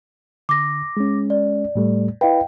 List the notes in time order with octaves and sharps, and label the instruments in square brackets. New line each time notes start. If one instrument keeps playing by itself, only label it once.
[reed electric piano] D3 [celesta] D6 A#6
[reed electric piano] G#3 C#4
[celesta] D5
[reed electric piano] A2 G3 A3
[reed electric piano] E4 B4 [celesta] D#5 F5 G5